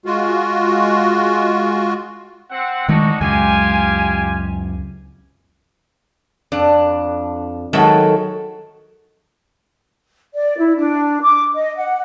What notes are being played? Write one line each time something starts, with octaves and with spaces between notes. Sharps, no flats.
G#3 F4 F#4
C4 F#5
D#3 G#3 A3 D4 D#4 F#4
C#2 F#2 G#3 F4 G4 G#5
F2 D4
D#3 F#3 G#3 A4 E5
D5
E4
D4
D6
D#5
F#5